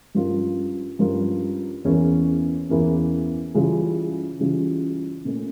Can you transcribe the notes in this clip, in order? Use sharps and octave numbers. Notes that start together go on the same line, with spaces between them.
G2 F3 C#4 F4 A#4
G2 F3 C#4 F4 A#4
E2 E3 A#3 C#4
E2 E3 A#3 C#4
C#3 E3 G3 C#4 F4
C#3 E3 G3 C#4 F4
A#2 A3 C#4